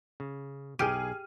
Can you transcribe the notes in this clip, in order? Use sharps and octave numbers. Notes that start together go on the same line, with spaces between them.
C#3
B1 D#4 G4 G#4 F6 D#7